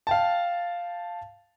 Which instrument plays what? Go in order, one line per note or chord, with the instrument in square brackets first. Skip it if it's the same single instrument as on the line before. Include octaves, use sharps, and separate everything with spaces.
[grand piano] F5 G5 A5